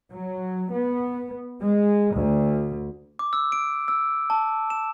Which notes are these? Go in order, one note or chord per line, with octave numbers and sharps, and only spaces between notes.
F#3
B3
G#3
D2
D6
E6
D7
E6
A5
E7